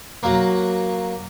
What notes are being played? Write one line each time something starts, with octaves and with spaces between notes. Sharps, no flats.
F#3 A#3